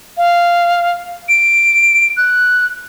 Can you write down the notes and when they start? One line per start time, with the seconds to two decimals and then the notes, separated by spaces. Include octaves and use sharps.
0.18 F5
1.29 D7
2.17 F#6